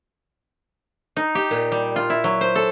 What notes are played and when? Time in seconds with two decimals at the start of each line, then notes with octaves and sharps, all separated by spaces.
1.17 D#4
1.35 G4
1.51 A#2
1.72 G3
1.96 F4
2.10 E4
2.24 F#3
2.41 C5
2.55 A4